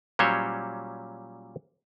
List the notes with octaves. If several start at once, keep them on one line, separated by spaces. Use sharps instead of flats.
A#2 F#3 G3 C#4 C5 C#5